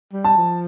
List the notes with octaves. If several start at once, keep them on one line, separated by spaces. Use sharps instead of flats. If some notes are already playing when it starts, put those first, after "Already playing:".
G3
A5
F3